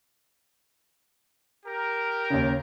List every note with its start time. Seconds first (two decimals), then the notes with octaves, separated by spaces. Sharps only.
1.65 G4 A#4
2.30 D#2 C#3